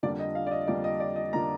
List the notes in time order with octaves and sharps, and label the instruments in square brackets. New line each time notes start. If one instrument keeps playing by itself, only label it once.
[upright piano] F2 D3 G3 A#3 D5
D#5
F5
D5
D#5
F2 D3 G3 A#3 D5
D#5
D5
D#5
D3 G3 A#3 A#5